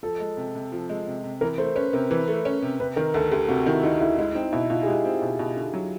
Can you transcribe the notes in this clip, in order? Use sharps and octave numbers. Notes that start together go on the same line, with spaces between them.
F3 A4
G#3
C3
C3
F3
G#3
C3
C3
E3 A#4
A3 C5
C#4 B4
C3 A#4
E3 B4
A3
C#4
C3
C3 B4
D#3 A#4
D2 A4
D2 G4
C3 F#4
D#3 E4
D2 D#4
D2 E4
G#3 E4
C4 D#4
B2 E4
B2 F4
G#4
G#3 G4
C4
B2
B2
D3
F#3